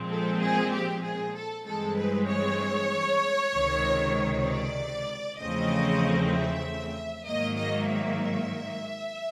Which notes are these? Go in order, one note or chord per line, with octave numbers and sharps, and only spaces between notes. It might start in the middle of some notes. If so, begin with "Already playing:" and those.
Already playing: A#2 F3 G#3 C4
A4
G#4
G4
G#4
A4
G2 E3 G#3 C4 A4
B4
C#5
C#2 C3 D#3
D5
E2 C#3 F3 A3 C4 D#5
E5
G#2 D#3 F#3 A#3 D#5
D#5
E5